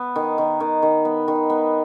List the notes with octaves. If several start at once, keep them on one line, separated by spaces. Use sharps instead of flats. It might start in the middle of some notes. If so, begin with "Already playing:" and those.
Already playing: B3
D#3
D#3
D#3
D#3
B3
D#3
B3